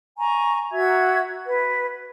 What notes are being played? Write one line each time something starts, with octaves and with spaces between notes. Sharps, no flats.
G#5 A#5 C#6
F#4 E5 E6 G#6
B4